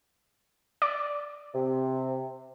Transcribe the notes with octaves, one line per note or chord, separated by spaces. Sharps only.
D5
C3